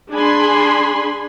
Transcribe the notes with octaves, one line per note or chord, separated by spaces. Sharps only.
D4 G#4 G#5 B5 C6